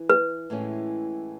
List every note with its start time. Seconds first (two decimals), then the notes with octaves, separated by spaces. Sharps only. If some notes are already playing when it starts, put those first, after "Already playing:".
Already playing: E3
0.10 B4
0.50 A2 E3 G#3 C#4